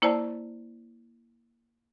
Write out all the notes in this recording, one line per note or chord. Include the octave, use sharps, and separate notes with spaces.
A#3 E4 C5 D5 A5